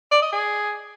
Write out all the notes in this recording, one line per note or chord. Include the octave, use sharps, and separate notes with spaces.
D5
D#5
G#4